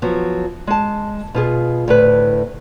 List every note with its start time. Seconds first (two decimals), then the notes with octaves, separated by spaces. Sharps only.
0.02 F3 F#3 B3
0.67 G#3 A5
1.34 B2 F4 G#4
1.88 D2 A2 B4